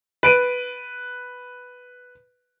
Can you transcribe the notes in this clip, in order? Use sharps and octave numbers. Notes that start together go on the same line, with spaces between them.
B4 D7 D#7